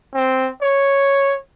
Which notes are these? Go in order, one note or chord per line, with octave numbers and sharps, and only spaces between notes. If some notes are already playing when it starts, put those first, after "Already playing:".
C4
C#5